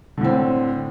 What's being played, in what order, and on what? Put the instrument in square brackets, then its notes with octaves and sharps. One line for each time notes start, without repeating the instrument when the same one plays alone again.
[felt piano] D3
A2
C4